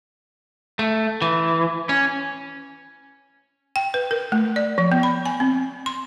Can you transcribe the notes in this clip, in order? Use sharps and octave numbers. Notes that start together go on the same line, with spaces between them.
A3
E3
C#4
G5
B4
A#4
A3
D5
F3
B3
B5
G#5
C4
C6